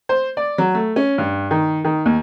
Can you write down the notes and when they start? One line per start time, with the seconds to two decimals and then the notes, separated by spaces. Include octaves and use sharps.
0.09 C5
0.37 D5
0.58 F#3
0.74 A3
0.96 C#4
1.18 G2
1.51 D#3
1.84 D#3
2.06 D#2